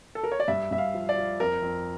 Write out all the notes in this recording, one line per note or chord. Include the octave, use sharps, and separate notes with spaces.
A4
A#4
C#5
D5
G2 E5
G2 E5
F5
F3
D5
F3
F2 A#4
F2